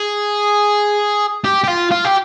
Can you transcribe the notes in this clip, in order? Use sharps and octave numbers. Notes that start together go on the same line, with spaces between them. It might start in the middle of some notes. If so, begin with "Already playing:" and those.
Already playing: G#4
G4
G4
F4
F4
G4